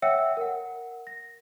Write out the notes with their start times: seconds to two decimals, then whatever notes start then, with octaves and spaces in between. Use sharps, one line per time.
0.02 C#5 E5 F#5 G5 E6 C#7
0.37 A#4 F#5
1.07 A#6